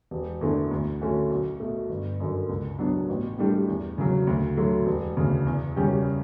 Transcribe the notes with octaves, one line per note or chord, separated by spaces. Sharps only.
E1
E2 D3 A3 D4
D2
D3 A3 C#4 F#4
B1
B2 A3
G1
F#2 D3
C#2
B2 F#3 B3 D4
A1
A2 G3 D4 G4
E2
C#3 F#3
D2
D3 F#3 A3
E1
D2 C#3
E2
C#3 G3 C#4 G4